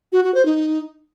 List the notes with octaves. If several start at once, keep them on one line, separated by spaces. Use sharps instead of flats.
F#4
F#4
C5
D#4